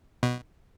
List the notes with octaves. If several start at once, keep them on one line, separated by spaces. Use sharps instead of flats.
B2